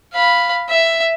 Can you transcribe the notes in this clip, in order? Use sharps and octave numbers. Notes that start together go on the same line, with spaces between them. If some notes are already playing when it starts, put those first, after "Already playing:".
F5 B5
E5